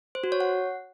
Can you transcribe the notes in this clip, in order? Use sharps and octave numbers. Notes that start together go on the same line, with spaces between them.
C5
F#4
C#5
F#5